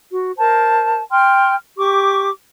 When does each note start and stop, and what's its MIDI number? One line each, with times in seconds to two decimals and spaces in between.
0.11 0.31 66
0.37 0.99 70
0.37 0.99 72
0.37 0.99 81
1.10 1.54 79
1.10 1.54 84
1.10 1.54 89
1.77 2.29 67
1.77 2.29 85
1.77 2.29 86